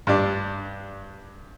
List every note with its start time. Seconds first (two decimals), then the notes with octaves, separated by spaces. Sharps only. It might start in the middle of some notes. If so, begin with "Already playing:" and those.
0.07 G2 D4